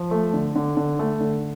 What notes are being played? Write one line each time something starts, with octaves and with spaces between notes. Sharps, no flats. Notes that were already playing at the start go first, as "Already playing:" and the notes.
Already playing: F3
A3
D3
D3
D3
A3
D3